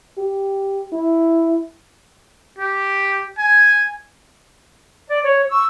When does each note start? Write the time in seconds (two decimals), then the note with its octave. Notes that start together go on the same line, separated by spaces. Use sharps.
0.18 G4
0.93 E4
2.58 G4
3.38 G#5
5.09 D5
5.24 C#5
5.50 C#6 E6